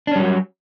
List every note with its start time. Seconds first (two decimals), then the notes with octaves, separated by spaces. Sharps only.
0.07 D4
0.11 C#4
0.16 G3
0.20 F#3
0.24 F#4